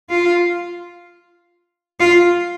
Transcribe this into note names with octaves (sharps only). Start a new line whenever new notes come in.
F4
F4